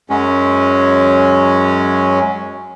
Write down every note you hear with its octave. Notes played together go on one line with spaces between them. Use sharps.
F#2 F#3 G#3 C#4